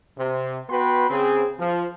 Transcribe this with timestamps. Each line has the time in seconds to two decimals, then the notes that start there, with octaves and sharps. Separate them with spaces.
0.17 C3
0.69 B3 F#4 B4 G5 B5 C6
1.09 C#3 C4 G#4
1.59 F3